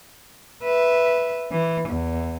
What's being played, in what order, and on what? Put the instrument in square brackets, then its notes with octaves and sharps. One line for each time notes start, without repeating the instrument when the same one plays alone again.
[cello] B4 E5
E3
E2